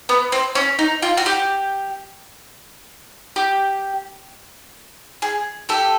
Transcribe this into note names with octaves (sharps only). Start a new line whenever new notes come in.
B3
C4
C#4
D#4
F4
F#4
G4
G4
G#4
G4 A4